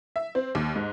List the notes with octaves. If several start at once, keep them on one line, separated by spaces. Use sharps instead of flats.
E5
C4
D#2
G#2